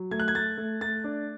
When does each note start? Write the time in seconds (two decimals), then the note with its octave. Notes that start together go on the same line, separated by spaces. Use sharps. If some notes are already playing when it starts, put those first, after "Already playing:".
Already playing: F#3
0.11 A3 G#6
0.20 F#6
0.28 G#6
0.34 A3 A6
0.58 A3
0.81 A3 A6
1.04 D4